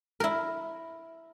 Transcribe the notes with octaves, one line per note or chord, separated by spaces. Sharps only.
E4 A#4